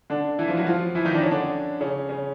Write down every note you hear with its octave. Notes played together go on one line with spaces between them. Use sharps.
D3 D4
E3 E4
F3 F4
F#3 F#4
F3 F4
E3 E4
D#3 D#4
D4
C#4
D3 D4
C#3 C#4
C#3 C#4